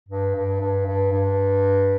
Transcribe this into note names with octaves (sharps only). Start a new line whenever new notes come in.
G2
G2
G2
G2
G2